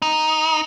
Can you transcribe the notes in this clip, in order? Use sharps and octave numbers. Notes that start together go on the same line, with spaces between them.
D#4